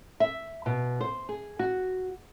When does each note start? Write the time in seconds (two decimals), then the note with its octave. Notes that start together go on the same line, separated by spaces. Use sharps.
0.20 E5
0.66 B2
1.01 C5
1.29 G#4
1.59 F#4